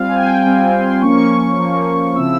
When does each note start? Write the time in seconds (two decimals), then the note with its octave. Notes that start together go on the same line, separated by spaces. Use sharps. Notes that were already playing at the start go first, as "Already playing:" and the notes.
Already playing: G3 C4 F4 F5
0.09 G#5
0.15 G5
0.44 G3 C4 F4 G#5
0.72 C6
1.01 F3 A#3 C#4 C#6
1.58 F3 A#3 C#4
2.16 C#3 F3 C4 E4 E6